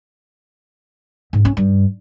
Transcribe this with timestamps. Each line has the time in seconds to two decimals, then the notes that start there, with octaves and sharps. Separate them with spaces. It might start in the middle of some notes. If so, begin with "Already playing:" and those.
1.33 G#2
1.45 C#4
1.57 G2